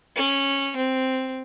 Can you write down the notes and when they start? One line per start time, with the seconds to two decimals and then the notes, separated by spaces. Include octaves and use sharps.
0.16 C#4
0.77 C4